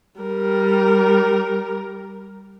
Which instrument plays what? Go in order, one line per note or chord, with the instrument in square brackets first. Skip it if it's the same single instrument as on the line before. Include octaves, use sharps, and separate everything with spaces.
[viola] G3 A#4